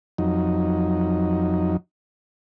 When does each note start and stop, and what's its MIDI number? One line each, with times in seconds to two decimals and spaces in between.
0.18 1.77 41
0.18 1.77 54
0.18 1.77 63